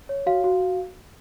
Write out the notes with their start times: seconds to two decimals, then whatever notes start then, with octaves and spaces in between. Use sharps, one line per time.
0.09 C#5
0.26 F#4 F5
0.44 F#4